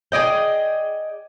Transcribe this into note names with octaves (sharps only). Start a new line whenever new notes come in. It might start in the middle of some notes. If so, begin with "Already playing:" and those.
G#4 D5 D#5 G5